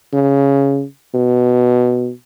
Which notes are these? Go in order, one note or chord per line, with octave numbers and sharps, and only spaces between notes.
C#3
B2